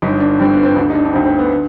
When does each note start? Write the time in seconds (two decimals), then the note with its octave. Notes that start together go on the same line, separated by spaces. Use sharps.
0.02 G1 G2 D3 D#4
0.20 D4
0.39 G1 G2 D3 C4
0.51 B3
0.63 C4
0.76 D2 D3 D4
0.90 D#4
0.95 D4
1.05 D4
1.13 D2 D3 C4
1.25 C4
1.38 B3
1.52 D3